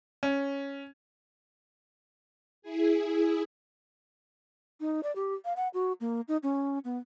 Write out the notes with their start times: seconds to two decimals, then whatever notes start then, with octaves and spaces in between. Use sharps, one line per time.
0.23 C#4
2.62 E4 G#4
4.80 D#4
5.03 D5
5.16 G4
5.45 F5
5.56 F#5
5.74 F#4
6.01 A#3
6.28 D#4
6.43 C#4
6.85 B3